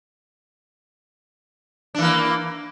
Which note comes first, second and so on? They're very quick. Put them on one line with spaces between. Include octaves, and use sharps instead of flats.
D4 E3 A#3